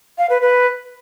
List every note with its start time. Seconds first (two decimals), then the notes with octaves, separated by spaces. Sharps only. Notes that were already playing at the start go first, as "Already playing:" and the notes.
0.18 F5
0.30 B4
0.41 B4